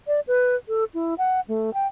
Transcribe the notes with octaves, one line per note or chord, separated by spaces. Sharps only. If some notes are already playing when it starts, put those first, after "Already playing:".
D5
B4
A4
E4
F#5
A3
G5